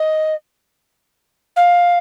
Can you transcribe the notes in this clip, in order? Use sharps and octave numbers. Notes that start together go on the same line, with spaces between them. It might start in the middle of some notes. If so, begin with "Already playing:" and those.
Already playing: D#5
F5